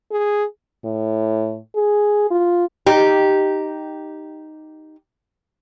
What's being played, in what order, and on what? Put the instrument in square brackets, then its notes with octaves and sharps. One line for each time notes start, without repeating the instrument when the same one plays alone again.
[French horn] G#4
[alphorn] A2
G#4
F4
[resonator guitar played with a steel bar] D#4 G4